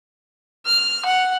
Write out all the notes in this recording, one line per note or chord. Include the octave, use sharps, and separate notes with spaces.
F6
F#5